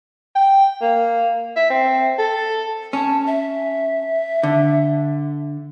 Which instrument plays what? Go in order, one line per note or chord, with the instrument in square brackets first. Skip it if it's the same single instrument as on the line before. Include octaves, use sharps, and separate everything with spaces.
[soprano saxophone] G5
A#3
E5
C4
A4
[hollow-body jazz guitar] C#4 [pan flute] A5
[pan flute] E5
[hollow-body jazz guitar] D3